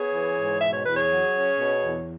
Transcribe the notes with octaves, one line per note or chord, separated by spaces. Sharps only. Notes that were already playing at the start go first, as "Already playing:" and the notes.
Already playing: B3 G#4 C#5
E3
G#2
B2 E5
C#5
E2 B4
G#4 C#5
F#3
C#4
B2
E2